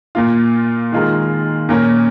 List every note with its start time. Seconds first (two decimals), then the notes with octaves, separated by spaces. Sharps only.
0.15 A#2 A#3 F4
0.92 D#3 G#3 F4 A#4
1.69 A#2 A#3 C#4 A#4